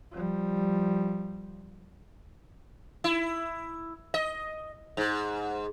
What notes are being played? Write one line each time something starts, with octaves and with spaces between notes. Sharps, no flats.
F3 G3
E4
D#5
G#2